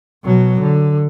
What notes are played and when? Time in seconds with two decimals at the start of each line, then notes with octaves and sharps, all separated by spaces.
0.24 B2 F#3
0.61 D3